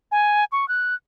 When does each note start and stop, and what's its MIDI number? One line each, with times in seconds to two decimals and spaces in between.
0.12 0.45 80
0.52 0.68 85
0.68 0.94 90